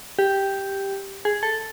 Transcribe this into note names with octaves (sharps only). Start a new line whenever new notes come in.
G4
G#4
A4